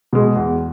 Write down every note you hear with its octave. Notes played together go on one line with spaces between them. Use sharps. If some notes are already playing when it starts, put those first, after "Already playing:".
B2 G#3
E2